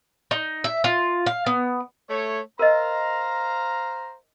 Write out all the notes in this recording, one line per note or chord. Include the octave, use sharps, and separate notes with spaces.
D#4
E5
F4
F5
B3
A3 C#5
A#4 C5 D#5 F5 A#5